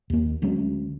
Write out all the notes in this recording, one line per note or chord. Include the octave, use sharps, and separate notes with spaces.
D#2 A#3
D2 F#3 G#3 C#4